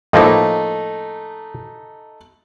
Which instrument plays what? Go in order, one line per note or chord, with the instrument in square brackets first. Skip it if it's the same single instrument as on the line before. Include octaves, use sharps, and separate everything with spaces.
[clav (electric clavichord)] A2 F3 A#3 [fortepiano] A3 D#4